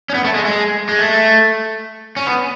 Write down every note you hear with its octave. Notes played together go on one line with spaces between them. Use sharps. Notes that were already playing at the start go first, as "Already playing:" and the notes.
C#4
B3
A3
G#3
G#3
G#3
A3
C#4
B3